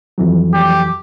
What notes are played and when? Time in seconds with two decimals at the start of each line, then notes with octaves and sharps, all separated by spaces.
0.18 F2 E3 F#3
0.53 G4